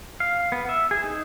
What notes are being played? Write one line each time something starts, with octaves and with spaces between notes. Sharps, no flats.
F5
B3
E5
G#4
D#4